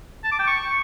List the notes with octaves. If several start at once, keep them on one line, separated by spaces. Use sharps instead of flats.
A5
D6
G5
C#6